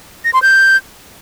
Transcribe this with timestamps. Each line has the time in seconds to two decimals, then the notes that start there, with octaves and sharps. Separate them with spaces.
0.25 A#6
0.33 C6
0.42 G6